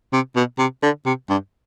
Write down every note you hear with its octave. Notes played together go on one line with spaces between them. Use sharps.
C3
B2
C3
D3
C3
G2